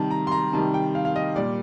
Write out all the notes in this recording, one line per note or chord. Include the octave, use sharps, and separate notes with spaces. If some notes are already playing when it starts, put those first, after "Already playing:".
Already playing: C3 D#3 G3 A5
A#5
C6
A#5
C3 D#3 G3 A5
G5
F5
F5
D#5
A#2 G3 D5